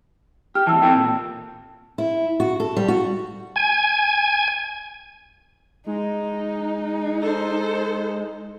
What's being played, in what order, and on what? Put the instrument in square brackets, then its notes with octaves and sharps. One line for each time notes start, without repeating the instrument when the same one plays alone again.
[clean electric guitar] G4 [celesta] F6
[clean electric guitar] C2 E3 [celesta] A5 E6
[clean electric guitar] C4 A4 G5
A#2
[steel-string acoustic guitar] E4
F#4
A4
G3
F#4
[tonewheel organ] G#5
[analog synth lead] G#3 [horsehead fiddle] D#4
[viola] A4 C5